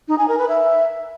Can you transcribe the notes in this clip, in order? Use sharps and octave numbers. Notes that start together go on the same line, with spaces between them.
D#4
G#5
A#4
B4
E5